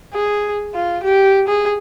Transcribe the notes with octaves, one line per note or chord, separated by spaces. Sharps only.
G#4
F4
G4
G#4